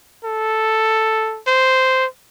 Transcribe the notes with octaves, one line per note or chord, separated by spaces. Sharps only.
A4
C5